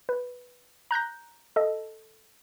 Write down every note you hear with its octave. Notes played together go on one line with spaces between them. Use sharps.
B4
A#5 F#6 G6 A#6
A4 D#5